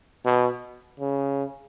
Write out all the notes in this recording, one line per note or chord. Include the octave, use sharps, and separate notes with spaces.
B2
C#3